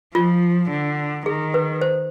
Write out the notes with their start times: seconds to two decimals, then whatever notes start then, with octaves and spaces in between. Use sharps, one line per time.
0.15 F3 F4
0.71 D3
1.26 D#3 G#4
1.54 B4
1.81 C5